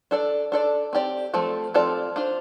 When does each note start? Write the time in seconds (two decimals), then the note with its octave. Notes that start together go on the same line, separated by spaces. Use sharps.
0.11 D4 A4 D5
0.52 D4 A4 D5
0.93 C4 G4 D5
1.34 F3 A3 C4 A4
1.74 F3 C4 F4 A4 D5
2.16 D4 F4 C5